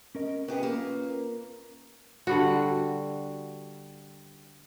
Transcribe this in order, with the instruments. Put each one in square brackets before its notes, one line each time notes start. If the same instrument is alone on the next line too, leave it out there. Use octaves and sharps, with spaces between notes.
[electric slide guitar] C#4 A#4 D#5
[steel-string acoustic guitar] B3 G4 G#4 [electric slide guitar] C#4 F4 B4
[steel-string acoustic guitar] A#3
[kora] D3 G3 F#4